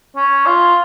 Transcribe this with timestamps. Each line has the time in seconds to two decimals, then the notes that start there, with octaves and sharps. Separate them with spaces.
0.16 C#4
0.47 F4